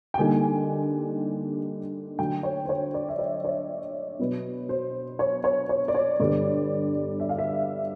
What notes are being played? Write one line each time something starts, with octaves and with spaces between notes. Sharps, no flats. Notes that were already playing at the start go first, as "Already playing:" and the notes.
G5
D3 G3 A#3 D#4 G#5
D3 F#3 A3 D4 G5
C#5
C5
C#5
D5
E5
D#5
C#5
B2 F#3 B3
C5
C#5
C#5
C#5
D5
C#5
G2 D3 G3 B3 D5
E5
F5
E5